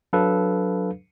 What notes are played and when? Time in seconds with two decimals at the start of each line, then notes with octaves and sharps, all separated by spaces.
0.13 F#3 D4 A4 B4 F5